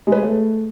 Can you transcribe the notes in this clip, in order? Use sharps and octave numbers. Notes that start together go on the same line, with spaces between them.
G#3
B4
G#4
A3